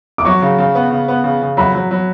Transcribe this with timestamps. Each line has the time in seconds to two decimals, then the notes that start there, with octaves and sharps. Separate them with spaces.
0.18 D6
0.25 F#3 C#6
0.42 C#3
0.58 C#3
0.75 B3
0.91 C#3
1.08 B3
1.24 C#3
1.41 C#3
1.57 F#3 B5
1.75 F#3
1.91 F#3